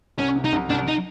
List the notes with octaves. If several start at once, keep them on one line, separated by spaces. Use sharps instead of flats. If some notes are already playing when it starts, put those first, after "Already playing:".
C2 C#4
C3
D#4
C2
C2 D4
D#4